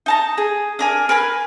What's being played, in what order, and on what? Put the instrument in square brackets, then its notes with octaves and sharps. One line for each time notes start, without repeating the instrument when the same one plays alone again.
[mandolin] D#4 A5 A#5
G#4
D4 A#4 G#5
A#4 B4 G#5 C6